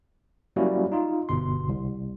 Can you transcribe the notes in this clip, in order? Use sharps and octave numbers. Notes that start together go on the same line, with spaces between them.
F#3 G3 A#3 C#4 E4 F#4
D#4 F4
G1 B2 C6
C2